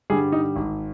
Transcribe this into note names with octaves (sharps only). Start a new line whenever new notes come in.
G2 D3 G3 G#4
D#4
G#1